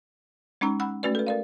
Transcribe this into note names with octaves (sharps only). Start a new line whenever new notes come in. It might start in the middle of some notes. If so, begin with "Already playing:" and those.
G#3 C#4 D#4 A#5 E6
F#5 B5 E6 F#6
A3 C#4 F#4 B4 D5
A4 B4
A#4 D5 F5